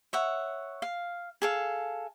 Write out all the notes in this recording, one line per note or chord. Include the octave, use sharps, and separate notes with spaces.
C#5 E5 F#5
F5
G#4 A4 F5